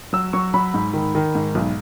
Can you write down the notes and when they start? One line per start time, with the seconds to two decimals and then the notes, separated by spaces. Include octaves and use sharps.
0.13 F#3 E6
0.33 F#3 C#6
0.54 F#3 B5
0.74 G#2
0.93 D#3
1.15 D#3
1.35 G#2
1.55 B1